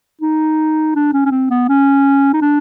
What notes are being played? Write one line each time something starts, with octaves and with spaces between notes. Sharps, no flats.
D#4
D4
C#4
C#4
C4
B3
C#4
D#4
D4